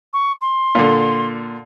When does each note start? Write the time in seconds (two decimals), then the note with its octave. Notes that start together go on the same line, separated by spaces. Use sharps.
0.13 C#6
0.41 C6
0.75 A#2 D3